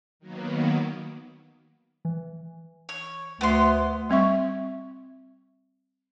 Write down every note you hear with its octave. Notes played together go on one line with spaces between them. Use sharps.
D#3 F#3 A#3 B3
E3
C#5
D2 B3 C6 F#6 G7
G3 C4 E5 C#6